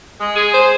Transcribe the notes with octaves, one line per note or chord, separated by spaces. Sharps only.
G#3
G#4
C5